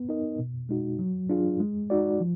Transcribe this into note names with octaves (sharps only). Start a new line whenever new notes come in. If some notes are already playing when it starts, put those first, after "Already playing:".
Already playing: B3
D#4 A#4 D#5
B2
G#3 D#4 F#4
F#3
D4 F4 G#4
G#3
D#4 F#4 D5
F3